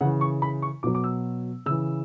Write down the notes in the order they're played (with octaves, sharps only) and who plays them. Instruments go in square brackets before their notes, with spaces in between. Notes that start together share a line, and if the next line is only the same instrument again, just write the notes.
[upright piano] C#3 E3 F#5
C#6
B5
C#6
B2 F#3 D6
D6
E6
C#3 E3 E6